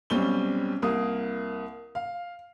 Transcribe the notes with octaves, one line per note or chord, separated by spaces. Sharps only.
B1 G3 C4 C#4 G7
C2 A#3 D#6
F5